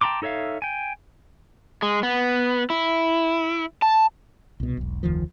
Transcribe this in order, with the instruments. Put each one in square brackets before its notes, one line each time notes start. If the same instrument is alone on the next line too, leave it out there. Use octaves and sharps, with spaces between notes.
[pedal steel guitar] G5 A5 A#5 C6 D6
D#4 A4 C#5 E5 F5
G5 G#5
[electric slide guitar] G#3
B3
E4
A5
[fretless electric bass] C2 B2
E1 B1
F1 D2 D#3 F3